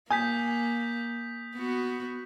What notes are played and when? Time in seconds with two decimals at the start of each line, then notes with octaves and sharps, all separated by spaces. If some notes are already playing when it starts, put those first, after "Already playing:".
0.10 A#3 G#5 D#6 G6 B6
1.56 B3 F#4